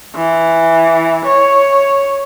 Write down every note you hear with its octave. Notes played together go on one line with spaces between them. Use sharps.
E3
C#5